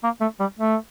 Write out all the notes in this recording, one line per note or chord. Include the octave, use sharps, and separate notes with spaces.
A#3
A3
G3
A3